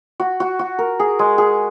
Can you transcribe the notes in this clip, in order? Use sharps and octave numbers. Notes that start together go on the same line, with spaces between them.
F#4
F#4
F#4
A#4
G#4
G#3
G#4